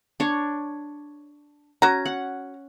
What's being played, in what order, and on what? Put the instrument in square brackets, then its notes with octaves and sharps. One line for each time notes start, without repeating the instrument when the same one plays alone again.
[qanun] D4 C#5
[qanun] C#4 [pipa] F#4 A#5
[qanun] F#5